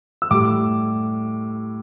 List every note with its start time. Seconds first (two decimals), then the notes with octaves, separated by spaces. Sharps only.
0.22 E6
0.31 A2 G3 D6